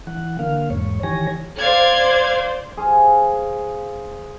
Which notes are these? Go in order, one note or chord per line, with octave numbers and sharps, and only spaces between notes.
E3 F#5
D3 A#3 F5
E2 G#2 C#5
D#3 E3 G4 C#5 G#5 A#6
C5 D5 F5 G#6
G#4 C5 F5 G#5